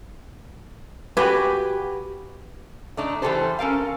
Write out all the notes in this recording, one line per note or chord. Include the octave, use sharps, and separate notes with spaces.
F#4 G4 B4 G#5
A3 D4 D#4
E3 G3 A3 G4 A4 C5
C#4 A4 A#4 F5